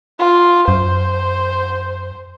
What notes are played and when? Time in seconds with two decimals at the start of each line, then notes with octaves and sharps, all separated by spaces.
0.19 F4
0.68 F#2 C5